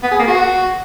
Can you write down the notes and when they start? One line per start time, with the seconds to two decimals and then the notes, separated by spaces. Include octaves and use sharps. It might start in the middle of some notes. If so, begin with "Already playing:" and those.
0.03 B3
0.11 G#4
0.20 A#3
0.28 F#4